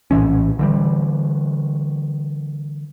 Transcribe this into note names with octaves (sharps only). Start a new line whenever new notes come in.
A#1 A2 E3 C#4
D3 E3 G3